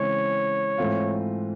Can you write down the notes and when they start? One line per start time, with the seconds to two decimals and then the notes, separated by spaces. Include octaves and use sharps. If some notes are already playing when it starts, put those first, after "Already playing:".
Already playing: C#3 E3 G#3 C4 C#5
0.78 G#2 E3 A3 C4 F4